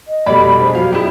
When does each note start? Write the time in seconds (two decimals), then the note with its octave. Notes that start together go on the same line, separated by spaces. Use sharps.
0.08 D#5
0.26 F1 B2 G3 D5 B5
0.61 D4 G#4 C5
0.75 F3 F#3 F5
0.92 F#2 E4 G4 G#4